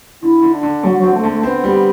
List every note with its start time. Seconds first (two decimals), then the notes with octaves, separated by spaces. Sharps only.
0.22 D3 E4
0.42 D3
0.52 D4
0.63 D3
0.83 D3 F#3
0.97 F#3
1.03 C4
1.13 A3
1.24 D3
1.29 A3
1.43 B3 C4
1.64 G3